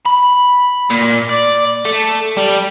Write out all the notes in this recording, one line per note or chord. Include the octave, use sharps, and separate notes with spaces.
B5
A#2
D5
A3
G3